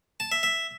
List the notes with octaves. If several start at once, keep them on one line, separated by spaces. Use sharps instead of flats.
A5
E5
E5